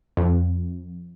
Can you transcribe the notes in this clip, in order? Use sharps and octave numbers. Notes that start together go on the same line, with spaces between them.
F2